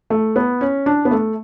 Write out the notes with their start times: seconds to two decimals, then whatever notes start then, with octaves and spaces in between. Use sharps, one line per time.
0.10 A3
0.36 B3
0.61 C#4
0.86 D4
1.05 B3
1.11 A3